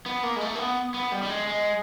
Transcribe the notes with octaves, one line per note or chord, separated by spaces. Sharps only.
B3
A#3
G#3
A3
A#3
B3
B3
G3
G3
G#3
G#3